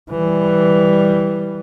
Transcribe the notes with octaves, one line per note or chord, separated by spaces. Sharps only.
E3 G3